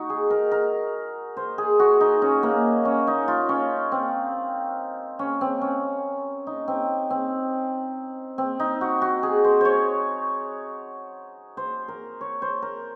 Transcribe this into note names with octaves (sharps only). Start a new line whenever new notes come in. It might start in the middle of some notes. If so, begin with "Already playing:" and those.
Already playing: D#4 F#4
G#4
A#4
A#4
C5
G#4
F#4
D#4
C#4
A#3
C#4
D#4
F4
C#4
C4
C#4
C4
C#4
D#4
C4
C4
C4
D#4
F#4
F#4
G#4
C5
C5 C#5
C5
A#4
C#5
C5
A#4